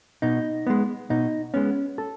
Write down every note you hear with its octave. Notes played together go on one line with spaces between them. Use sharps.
B2 D#4
G#3 B3
B2 D#4
G#3 B3 C#4
A4